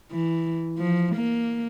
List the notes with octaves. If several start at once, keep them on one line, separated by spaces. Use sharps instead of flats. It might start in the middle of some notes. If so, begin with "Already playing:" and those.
E3
F3
A#3